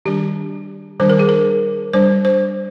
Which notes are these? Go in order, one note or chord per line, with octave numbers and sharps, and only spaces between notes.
D#3 G3 D4 G4
D#3 G3 D4 C5
A#4
G#4
A#4
G3 D4 C5
C5